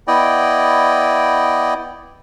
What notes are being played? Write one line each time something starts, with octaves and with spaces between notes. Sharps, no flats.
B3 E4 D5 D#5 G5